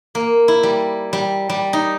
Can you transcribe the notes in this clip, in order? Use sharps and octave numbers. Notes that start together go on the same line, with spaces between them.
A#3
E4
G3
G3
G3
D#4